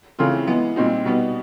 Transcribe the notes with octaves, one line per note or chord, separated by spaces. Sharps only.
C#3 E3 A3 C4 F4
E3 G#3 B3
A#2 G3 C4 D#4
B2 G3 B3 D#4